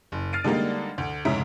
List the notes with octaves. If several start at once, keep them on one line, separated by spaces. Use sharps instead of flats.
F#1
F6 A6 C7 D7 D#7
D3 G3 G#3 A#3 D#4
D2
F1 G#2 C#3 E5 A#5 D7